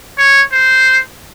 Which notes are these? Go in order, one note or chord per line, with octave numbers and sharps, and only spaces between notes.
C#5
C5